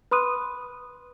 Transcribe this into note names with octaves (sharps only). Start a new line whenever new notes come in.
B4 B5 C6 D#6 F#6 D#7